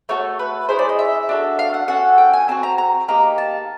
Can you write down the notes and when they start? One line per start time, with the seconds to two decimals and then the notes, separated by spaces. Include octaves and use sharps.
0.09 A3 D4 F#4 A4 C#5
0.39 B4
0.69 C#4 E4 G#4 C5
0.79 D5
0.89 D#5
0.99 E5
1.29 D4 F#4 A4
1.59 F5
1.74 F#5
1.88 C#4 F#4 A4 F#5
2.18 G5
2.33 G#5
2.48 C4 D#4 F#4 A5
2.63 A#5
2.78 A#5
3.08 A#3 D#4 G4 A#5
3.38 A5